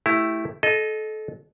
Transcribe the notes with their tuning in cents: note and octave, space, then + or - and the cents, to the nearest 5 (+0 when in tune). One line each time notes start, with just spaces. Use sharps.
A3 +0 E4 +0 G4 +0
A4 -25 D#5 -5